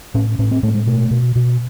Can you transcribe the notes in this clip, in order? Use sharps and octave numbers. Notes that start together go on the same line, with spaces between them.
A2 C#4
A2 C#4
C4
A2 A3
G#3
B2 A3
B2
B2